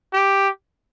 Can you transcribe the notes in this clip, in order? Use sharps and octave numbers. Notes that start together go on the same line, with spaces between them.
G4